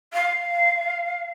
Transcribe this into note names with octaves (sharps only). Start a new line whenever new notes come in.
F5